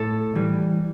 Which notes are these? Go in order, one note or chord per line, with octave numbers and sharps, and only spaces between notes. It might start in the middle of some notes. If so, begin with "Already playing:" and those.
Already playing: A2 A4
E3 G3